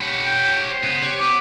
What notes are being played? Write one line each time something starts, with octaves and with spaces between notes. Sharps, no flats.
G4 C#5 F#5 B5
G5
C5
C#3 B3
G4 C#5
B3 D6